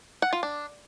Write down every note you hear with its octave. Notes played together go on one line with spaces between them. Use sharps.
F#5
F4
D4